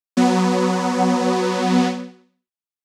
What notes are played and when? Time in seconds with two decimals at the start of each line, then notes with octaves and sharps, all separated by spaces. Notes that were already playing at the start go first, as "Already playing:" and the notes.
0.17 F#3 B3